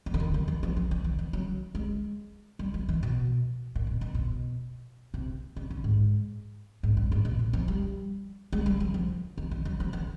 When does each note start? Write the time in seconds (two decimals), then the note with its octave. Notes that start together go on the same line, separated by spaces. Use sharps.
0.06 F3
0.14 D3
0.20 D#3
0.34 F#3
0.48 E3
0.63 F3
0.76 F3
0.91 F3
1.04 D#3
1.19 E3
1.33 F#3
1.75 G#3
2.59 G3
2.74 F3
2.89 E3
3.03 B2
3.75 A#2
3.87 B2
4.01 B2
4.14 B2
5.14 C3
5.56 C#3
5.70 D3
5.84 G#2
6.83 G#2
6.97 G2
7.12 G#2
7.25 A#2
7.39 B2
7.53 F3
7.68 G3
8.53 G#3
8.66 G3
8.80 F#3
8.94 F3
9.38 D#3
9.51 E3
9.65 F#3
9.80 F3
9.93 E3